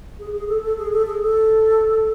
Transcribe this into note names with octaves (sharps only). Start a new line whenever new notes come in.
G#4
G#4
A4
A4
G#4
A4
G#4
A4